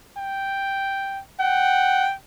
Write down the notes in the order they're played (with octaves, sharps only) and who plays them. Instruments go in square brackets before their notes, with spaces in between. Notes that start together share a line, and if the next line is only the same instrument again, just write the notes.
[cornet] G5
[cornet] F#5 [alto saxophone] G5